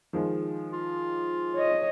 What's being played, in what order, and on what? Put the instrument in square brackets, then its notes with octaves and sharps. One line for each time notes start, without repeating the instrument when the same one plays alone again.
[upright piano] D#3 F3 G#3
[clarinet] F4
[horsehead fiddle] C#5 D#5